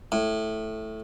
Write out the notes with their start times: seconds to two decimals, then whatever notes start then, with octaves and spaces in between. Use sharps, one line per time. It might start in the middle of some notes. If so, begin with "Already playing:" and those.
0.12 A2